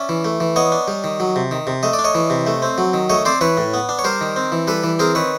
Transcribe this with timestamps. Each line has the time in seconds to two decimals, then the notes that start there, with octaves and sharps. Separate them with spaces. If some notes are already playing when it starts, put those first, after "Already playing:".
Already playing: C#4 D5 E5
0.09 E3
0.25 A3
0.40 E3
0.56 B3 C#5 D#5
0.72 D4
0.88 G3
1.04 D#3
1.20 F#3
1.36 C3
1.51 D#3
1.67 C3
1.83 A3 D#5
1.93 D5
1.99 D4
2.04 C#5 D#5
2.15 E3
2.30 C3
2.47 A3
2.62 C4
2.78 F#3
2.93 D#3
3.10 A3 C#5 D#5
3.25 C4 C5 D5
3.41 E3 B4 C#5
3.57 A2
3.74 B3
3.89 D4
3.99 C#5
4.04 G3 A#4 C5
4.21 D#3
4.36 C4
4.52 E3
4.67 G3 A4 B4
4.84 E3
4.99 C4 G#4 A#4
5.15 D#3 B4 C#5